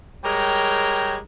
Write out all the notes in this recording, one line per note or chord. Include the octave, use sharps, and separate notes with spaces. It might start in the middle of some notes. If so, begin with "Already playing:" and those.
G3 G#3 A#4 C#5 G5